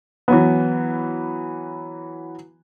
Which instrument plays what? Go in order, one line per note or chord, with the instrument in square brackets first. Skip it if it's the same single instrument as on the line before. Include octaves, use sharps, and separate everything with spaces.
[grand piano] E3 F#3 B3